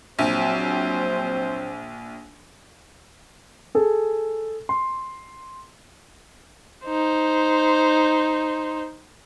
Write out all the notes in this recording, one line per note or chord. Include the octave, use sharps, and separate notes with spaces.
A#1 F#3 C4 C5
G#4 A4
C6
D#4 C5